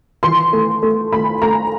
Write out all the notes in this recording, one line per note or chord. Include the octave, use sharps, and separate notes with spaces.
E3 C6
A3
A3
A3 B5
A3 A#5